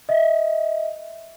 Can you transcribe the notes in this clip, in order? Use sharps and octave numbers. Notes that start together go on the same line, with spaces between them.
D#5 E5